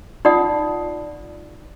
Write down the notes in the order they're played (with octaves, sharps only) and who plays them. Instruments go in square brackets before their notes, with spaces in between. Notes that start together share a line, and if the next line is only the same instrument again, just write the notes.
[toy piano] D#4 F4 D5 F#5 D#6